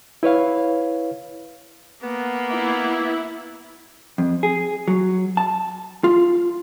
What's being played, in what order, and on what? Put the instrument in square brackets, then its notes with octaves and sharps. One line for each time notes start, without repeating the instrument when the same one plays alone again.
[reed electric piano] E4 B4 C#5 F5
[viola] A#3 [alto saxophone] B3
[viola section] E4
[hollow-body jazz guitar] F2
G#4
F#3
A5
F4